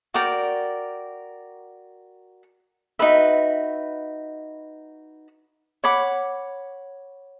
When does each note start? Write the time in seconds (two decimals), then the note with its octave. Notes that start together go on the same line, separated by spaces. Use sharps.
0.14 F#4 A#4 D5 G5
2.99 D#4 F#4 B4 E5
5.84 C#5 F#5 B5 D6